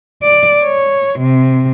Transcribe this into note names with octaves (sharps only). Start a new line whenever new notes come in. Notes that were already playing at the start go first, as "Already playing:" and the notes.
D5
C#5
C3